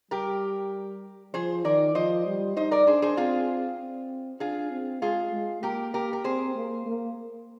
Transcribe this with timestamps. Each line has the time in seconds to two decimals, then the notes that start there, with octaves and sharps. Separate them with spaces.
0.11 G3 G4 A#4
1.34 F3 G#4 C5
1.65 D#3 A#4 D5
1.95 F3 C5 D#5
2.26 G3
2.56 D#4 C5 D#5
2.71 A#4 D5
2.87 D4 G#4 C5
3.02 G#4 C5
3.17 C4 F4 G#4
3.79 C4
4.40 D4 F4 G#4
4.71 C4
5.02 G#3 F4 G#4
5.33 G#3
5.63 A#3 G4 A#4
5.94 G4 A#4
6.13 A#4
6.24 C4 G#4 C5
6.55 A#3
6.86 A#3